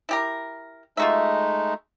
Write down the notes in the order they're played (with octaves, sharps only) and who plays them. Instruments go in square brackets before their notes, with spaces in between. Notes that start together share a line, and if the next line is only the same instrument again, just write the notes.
[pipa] E4 G4 A#4
[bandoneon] G#3 A3 D#4 [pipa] F4 F#4 E5